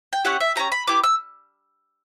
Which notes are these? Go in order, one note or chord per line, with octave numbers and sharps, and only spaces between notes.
G5
C#4 E4 G4 F#5
E5
C#4 E4 G4 A#5
B5
B3 E4 G4 D6
E6